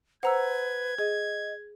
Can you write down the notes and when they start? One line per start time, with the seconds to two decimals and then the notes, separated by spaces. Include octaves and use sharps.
0.23 B4 C5 F#5 A#5 E6 G#6
0.99 G#4 D#5